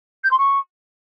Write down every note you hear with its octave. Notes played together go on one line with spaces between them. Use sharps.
G6
C6
C#6